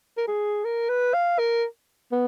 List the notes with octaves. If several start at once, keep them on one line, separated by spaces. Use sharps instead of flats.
A#4
G#4
A#4
B4
F5
A#4
B3